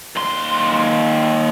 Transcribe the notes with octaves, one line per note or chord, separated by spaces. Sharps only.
D#2 C6